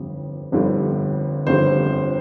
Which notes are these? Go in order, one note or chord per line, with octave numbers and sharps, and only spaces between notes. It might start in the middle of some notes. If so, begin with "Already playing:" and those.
Already playing: G1 F2 D3 G3
G1 F2 D3 G3
G1 F2 D3 G3 C5